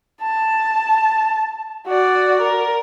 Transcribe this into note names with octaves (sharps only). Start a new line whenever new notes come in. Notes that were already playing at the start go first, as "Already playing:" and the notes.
A5
F#4 D5
A#4